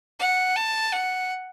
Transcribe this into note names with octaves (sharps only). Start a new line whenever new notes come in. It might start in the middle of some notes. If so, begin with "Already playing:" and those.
F#5
A5
F#5